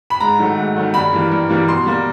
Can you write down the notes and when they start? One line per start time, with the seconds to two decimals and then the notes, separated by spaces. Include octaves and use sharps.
0.10 B5
0.20 G#2 A#5
0.39 D#3 F#3 A3
0.57 G#2
0.76 D#3 F#3 A3
0.94 G2 B5
1.13 E3 G3 A#3
1.32 G2
1.49 E3 G3 A#3
1.68 B2 C6
1.86 G3 A#3